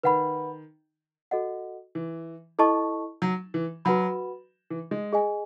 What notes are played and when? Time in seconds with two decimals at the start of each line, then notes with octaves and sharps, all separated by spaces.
0.04 D#3 B4 F#5 B5
1.31 F#4 A4 D#5 F#5
1.95 E3
2.59 E4 A4 D#5 A5 C#6
3.22 F#3
3.54 E3
3.85 F#3 F#4 B4 F#5 B5
4.70 E3
4.91 G#3
5.13 G#4 D#5 G#5